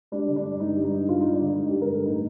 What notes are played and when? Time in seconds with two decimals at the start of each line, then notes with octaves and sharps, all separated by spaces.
0.12 G3 D4
0.28 D3
0.36 D4
0.44 G2
0.60 G2 D#4
0.77 G3
0.84 D#4
0.93 G2
1.08 G2 F4
1.20 D#4
1.25 G2
1.33 D4
1.41 D3
1.46 D#4
1.58 G2
1.69 G4
1.74 G2
1.81 A#4
1.89 G2 A4
2.05 A2 D#4